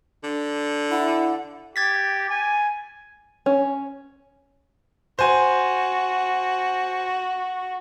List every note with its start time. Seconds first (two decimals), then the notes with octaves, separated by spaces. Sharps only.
0.23 D3
0.91 E4 F#5
1.76 G4 G#6 A6 B6
2.30 G#5
3.46 C#4
5.19 F#4 C5 G#5